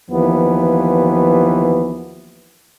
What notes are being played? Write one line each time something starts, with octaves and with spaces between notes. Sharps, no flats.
D#2 E3 F3 B3